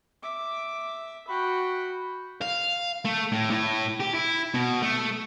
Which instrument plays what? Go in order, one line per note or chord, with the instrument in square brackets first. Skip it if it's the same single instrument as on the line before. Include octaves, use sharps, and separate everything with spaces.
[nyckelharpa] E5 D6
[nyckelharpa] F#4 G5 [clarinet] B5
[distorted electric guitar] F5
A3
A2
A2
G4
E4
B2
A3